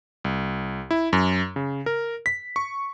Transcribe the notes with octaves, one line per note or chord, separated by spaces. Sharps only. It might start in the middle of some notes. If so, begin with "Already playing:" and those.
C2
E4
F#2
C#3
A#4
B6
C#6